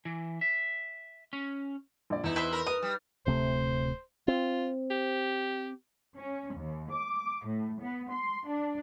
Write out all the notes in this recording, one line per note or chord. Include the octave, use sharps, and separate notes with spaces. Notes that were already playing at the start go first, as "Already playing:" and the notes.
E3
E5
C#4
A#1 D5
E2 D#4 E4
B4 C5 E5
A#4
B4 D#6
G3
D1 C3 A3 C5
C4 F4
G4
C#4
D#2
D6
A2
B3
C6
D4